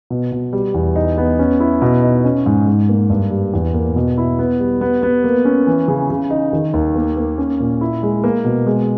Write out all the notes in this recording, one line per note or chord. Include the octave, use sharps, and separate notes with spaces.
B2
B2
G3
E2
D#4
B3
C#4
E4
B2
D#4
C#4
G#2
G#2
A#3
G2
G3
E2
A#3
B2
E4
B3
G3
B3
B3
A#3
C#4
E3
C#3
C#3
D#4
D#3
D#2
A#3
A#3
C#4
A#2
E4
G#3
A#3
B2
G#3